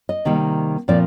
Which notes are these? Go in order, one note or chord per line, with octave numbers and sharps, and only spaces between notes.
D#5
C3 D#3 G3 A#3
A#2 F3 A3 C4 D5